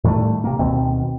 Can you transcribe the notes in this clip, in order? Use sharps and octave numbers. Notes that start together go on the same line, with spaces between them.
A2 D#3 G3 A3
C3 A#3
D2 B2 D#3 C4